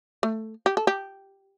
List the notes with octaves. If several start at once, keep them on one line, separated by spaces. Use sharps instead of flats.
A3
G4
A4
G4